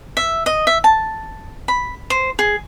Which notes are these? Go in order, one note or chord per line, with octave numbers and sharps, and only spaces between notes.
E5
D#5
E5
A5
B5
C5
G#4